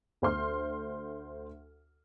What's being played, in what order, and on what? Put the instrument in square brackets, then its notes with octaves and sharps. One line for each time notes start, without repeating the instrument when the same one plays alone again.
[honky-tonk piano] D2 C5 C6 F6